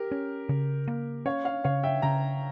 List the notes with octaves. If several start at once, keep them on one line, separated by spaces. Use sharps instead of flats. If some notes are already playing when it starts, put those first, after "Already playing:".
Already playing: G4 A#4
C#4
C#3
A#3
C#4 C#5 F5
C#5 F5
C#3 C#5 F5
E5 G5
C#3 G5 A#5